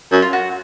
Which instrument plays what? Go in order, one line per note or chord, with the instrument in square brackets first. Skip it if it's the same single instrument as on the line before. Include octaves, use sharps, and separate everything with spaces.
[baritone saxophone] F#2
[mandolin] F4
F#4